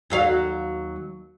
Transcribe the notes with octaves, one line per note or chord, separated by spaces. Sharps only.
D#2 F#3 F5